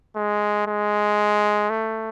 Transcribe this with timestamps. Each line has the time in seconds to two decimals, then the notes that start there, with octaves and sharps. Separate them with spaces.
0.16 G#3
0.67 G#3
1.69 A3